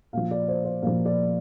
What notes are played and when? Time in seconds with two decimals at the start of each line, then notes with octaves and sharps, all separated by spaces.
0.13 A#2 F3 F5
0.31 D5
0.48 C5
0.65 C5
0.82 A#2 F3 F5
1.05 D5